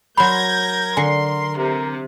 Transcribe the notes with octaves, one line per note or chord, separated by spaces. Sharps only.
F#3 A#4 B5 C6 G6 G#6 A#6
D3 G#5 C6
C3 A#4